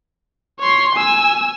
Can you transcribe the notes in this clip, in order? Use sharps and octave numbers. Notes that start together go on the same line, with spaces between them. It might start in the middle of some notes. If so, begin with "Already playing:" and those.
C#5 C6
G#5 E6